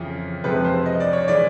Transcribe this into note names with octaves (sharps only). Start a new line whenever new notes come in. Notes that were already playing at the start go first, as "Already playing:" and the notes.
Already playing: F2 C#3 E3 F4
F2 C3 F3 G#3 B4
C5
D#5
D5
C#5
E3 G#3 D5